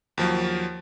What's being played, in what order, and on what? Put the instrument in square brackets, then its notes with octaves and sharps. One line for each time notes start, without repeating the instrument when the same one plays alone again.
[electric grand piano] D#2 F3 F#3